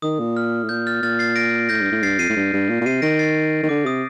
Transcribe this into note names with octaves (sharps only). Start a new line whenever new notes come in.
D#3 D#6
A#2
F6
A2
A#2 G6
F6 A6
A#2 F6 A6
A6 C7
A#6 D7
A2 G6 A#6
G2
A2
G2 A6 C7
F2 C7 D#7
A2
G2
G2
A#2
A#2
C3 C7 D#7
D#3 A#6 D7
A6 C7
D#3
D3 D6
C3 D#6